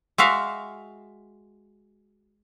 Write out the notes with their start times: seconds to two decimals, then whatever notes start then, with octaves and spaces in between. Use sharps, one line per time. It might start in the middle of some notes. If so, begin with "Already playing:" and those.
0.18 G#3 F#4 E5 F5